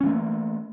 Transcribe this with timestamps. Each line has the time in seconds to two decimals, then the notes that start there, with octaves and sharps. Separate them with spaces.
0.01 C#4
0.03 E3
0.06 A3
0.09 A#3